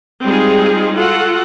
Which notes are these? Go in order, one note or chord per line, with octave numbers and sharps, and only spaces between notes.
G3 G#3 C4 D#4 F4 G#4
F4 F#4 A4 F#5